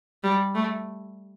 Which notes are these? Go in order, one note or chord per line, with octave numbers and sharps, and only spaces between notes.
G3
A3